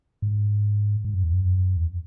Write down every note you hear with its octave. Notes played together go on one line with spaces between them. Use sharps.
G#2
G#2
F#2
E2
F#2
E2